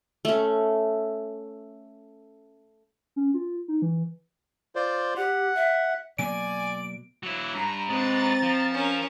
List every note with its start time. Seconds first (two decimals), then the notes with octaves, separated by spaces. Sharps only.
0.25 A3 C#4
3.16 C#4
3.34 F4
3.68 D#4
3.82 E3
4.76 F4 C5 D5
5.17 G4 F#5
5.55 E5
6.18 B2 F#3 A#3 D5 G#5 D7
7.23 F#3 E4
7.55 G2 A#5
7.90 G#3 C4 B4 A#5 A6
8.43 F3
8.74 C#4 A#4